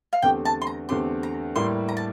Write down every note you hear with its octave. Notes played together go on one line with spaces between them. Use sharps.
F5
E2 D3 A3 C4 G4 G5
A5
C6
A#5
E2 D3 A3 C4 G4 C6
A#5
A2 G3 A#3 E4 G4 C6
A#5
A5